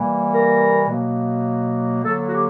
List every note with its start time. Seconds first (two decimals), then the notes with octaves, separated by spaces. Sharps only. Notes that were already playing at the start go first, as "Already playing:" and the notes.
Already playing: C3 E3 G3 A#3
0.31 A#4
0.88 B2 F#3 A#3
2.03 D3 F#3 A#3 A4
2.27 F#4
2.32 G4